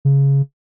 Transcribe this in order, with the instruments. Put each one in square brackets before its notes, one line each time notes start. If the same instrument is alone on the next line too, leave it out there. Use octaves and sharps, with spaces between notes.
[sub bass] C#3